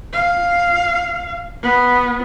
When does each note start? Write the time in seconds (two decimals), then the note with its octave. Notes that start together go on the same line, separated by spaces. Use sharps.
0.13 F5
1.62 B3